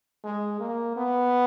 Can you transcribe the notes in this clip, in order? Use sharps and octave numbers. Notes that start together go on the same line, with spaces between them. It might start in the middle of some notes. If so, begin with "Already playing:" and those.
G#3
A#3
B3